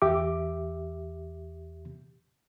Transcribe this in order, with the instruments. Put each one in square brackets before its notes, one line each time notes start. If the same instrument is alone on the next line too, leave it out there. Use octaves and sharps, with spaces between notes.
[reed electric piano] E2 G4 E5 D6